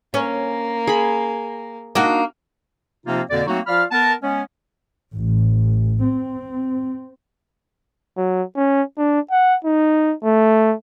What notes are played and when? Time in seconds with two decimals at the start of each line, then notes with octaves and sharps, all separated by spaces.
0.14 A#3 C#4
0.87 G#4 B5
1.95 A#3 D4 D#4 F#4
3.07 C3 F3 A#3 C4 D#4 F4
3.31 F2 B2 D3 A#3 D5
3.47 F#3 A3 A#3 C4 D#4 F#4
3.67 F3 F4 D5 F5 B5 F6
3.92 B3 A#4 A5
4.22 G#3 B3 C#4
5.13 A1
6.04 C4
8.17 F#3
8.56 C#4
8.98 D4
9.31 F#5
9.64 D#4
10.24 A3